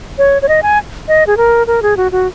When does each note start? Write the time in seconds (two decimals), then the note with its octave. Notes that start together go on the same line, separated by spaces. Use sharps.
0.18 C#5
0.42 C#5
0.49 D#5
0.63 G#5
1.08 D#5
1.27 G#4
1.37 A#4
1.67 A#4
1.82 G#4
1.97 F#4
2.12 F#4